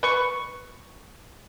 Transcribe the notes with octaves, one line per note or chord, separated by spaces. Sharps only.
B4 C#6